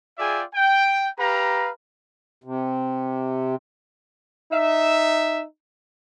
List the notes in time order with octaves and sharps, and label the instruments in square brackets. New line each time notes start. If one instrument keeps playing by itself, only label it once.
[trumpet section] F4 G#4 D5 E5 G5 G#5
G5
G4 B4 F5 A#5
[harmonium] C3
[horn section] D#4 E5